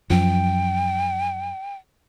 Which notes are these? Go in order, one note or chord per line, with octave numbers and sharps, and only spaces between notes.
F#2 F3 G5